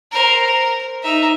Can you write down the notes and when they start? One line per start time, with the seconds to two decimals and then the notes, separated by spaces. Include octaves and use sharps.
0.12 A#4 C5
0.47 A#4
1.03 D#4 E5